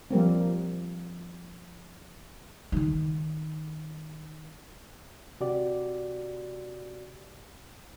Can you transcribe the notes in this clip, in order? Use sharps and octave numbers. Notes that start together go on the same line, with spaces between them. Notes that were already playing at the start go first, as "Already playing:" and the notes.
F3 G3 A#3 C4
D#3 D#4
C3 F#4 G4 D5